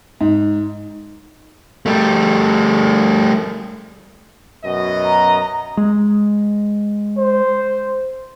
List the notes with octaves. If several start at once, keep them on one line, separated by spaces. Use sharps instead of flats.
G#2
G3 A3
F#2 B2 D#5
A#5
G#3
C5